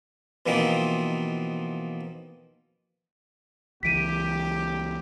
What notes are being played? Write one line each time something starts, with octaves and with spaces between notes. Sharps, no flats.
B2 E3 F3 A#3 C4 D#4
C#2 E3 G4 B6 D7 D#7